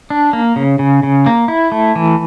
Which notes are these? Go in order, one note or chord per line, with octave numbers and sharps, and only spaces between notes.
D4
A#3
C#3
C#3
C#3
A#3
E4
A3
E3